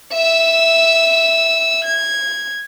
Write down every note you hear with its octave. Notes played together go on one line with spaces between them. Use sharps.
E5 E6
G#6